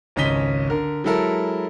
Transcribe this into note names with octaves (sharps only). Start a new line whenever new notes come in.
G#1 C#2 C#4 D#5 B6 G7
D3 A#4
F#3 G#3 E4 A4 A#4